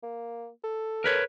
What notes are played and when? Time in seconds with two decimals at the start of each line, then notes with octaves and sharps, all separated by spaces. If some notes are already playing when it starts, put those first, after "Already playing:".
0.03 A#3
0.64 A4
1.04 A#4 B4 C#5